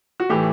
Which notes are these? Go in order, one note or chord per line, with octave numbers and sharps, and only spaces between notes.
F#4
A2 E3 A3 G4